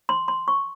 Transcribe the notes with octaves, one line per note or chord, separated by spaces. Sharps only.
C6
C6
C#6